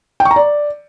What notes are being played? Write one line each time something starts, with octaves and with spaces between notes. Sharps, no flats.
G5
C#6
A#5
D5